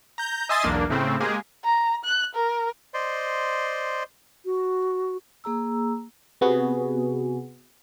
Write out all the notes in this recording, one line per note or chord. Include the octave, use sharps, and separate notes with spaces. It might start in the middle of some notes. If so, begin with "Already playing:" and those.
A#5 G6
D#5 E5 G#5 C6 D#6 A6
B1 E2 A#3 D4
A2 C#3 A3 C4
G#3 A#3 G4 G#4
A#5
F#6
A#4
C5 D5 D#5 C6
F#4
A#3 G#4 A#5 E6
C3 B3 F#4 G#4